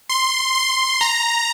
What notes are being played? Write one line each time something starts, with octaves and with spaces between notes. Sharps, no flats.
C6
C6
A#5